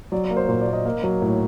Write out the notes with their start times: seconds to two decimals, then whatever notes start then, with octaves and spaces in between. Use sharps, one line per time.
0.12 F#3 D5
0.24 D5
0.31 A#3
0.37 C5
0.49 A#2 C5
0.61 D5
0.67 A#3
0.73 D#5
0.85 A#3
1.03 F#3
1.22 A2